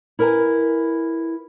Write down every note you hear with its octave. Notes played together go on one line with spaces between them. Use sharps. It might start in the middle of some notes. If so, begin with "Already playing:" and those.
E4 A#4 B4 G#5